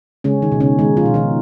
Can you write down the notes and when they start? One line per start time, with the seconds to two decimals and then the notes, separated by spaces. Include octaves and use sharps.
0.24 C#3 G#3 C#4
0.42 D#3 D#4
0.52 B2
0.60 C#3 C#4
0.79 D#3 G#3 D#4
0.97 F3 F4
1.05 B2
1.14 D#3 D#4